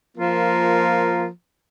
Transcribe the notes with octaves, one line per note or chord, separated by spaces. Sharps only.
F3 A#3 F4 A#4